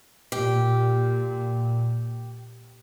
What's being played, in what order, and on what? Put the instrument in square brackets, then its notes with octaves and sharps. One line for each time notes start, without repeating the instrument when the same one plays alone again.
[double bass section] A#2 [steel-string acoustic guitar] G4